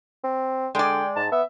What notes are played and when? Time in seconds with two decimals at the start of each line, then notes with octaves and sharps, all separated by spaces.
0.24 C4
0.75 D3 G#3 D5 G5
1.16 G#2 A5
1.32 B3 E5